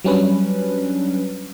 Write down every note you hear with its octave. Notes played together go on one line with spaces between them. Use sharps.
F#3 G3 C#4 D4 B4